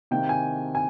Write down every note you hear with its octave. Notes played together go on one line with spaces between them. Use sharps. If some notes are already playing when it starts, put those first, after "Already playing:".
C3 D#3 A#3 G5
G#5
G#5